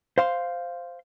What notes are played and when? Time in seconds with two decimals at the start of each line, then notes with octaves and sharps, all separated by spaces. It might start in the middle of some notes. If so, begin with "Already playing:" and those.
0.18 C5 F5 C6